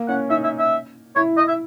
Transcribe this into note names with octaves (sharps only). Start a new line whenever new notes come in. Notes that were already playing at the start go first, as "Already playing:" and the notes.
Already playing: A#3
C#4 F#5
D#4 E5
E5
E5
E4 C#5
D#5
E5